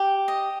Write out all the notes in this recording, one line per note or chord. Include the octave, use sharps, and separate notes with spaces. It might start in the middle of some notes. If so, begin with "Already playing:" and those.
Already playing: G4
D#5